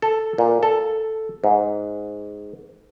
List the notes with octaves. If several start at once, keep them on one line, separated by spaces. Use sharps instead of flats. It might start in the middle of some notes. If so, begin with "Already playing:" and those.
A4
A#2
A4
G#2